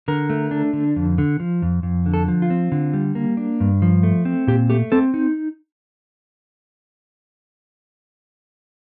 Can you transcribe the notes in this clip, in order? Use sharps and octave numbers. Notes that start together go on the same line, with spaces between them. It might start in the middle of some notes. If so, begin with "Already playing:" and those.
D3 A#4
A3
D4
D3
F2
D3
F3
F2
F2
D3
A4
F3
F4
C4
D3
G3
A#3
D4
G2
F3
A3
C4
A#2 G4
A3 G4
C4 A4
D#4